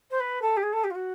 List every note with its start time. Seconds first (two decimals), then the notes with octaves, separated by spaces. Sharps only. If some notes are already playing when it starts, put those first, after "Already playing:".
0.10 C5
0.20 B4
0.41 A4
0.57 G4
0.63 G#4
0.73 A4
0.84 G4
0.90 F4
0.95 F#4